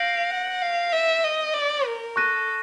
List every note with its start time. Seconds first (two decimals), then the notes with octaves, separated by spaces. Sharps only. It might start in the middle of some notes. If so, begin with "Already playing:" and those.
Already playing: F5 G6 A#6 D7 F#7
0.31 F#5
0.62 F5
0.93 E5
1.24 D#5
1.54 D5
1.86 A#4
2.16 A4 C#6 F#6 A#6 D#7